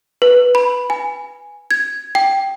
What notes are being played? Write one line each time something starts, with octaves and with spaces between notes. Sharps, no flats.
B4
B5
G#5
G#6
G5